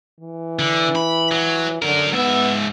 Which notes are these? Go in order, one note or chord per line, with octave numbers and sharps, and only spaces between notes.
E3
D3
B5
F#3
D3 F#3 A#4
G#2 B3 E5